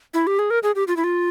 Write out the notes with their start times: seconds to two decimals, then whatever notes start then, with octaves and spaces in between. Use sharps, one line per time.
0.14 E4
0.27 G4
0.39 G#4
0.50 A#4
0.63 G#4
0.75 G4
0.88 F4
0.97 E4
1.04 F4